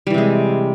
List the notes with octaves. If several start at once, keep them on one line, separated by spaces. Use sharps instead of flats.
C3 E3 G3 G#3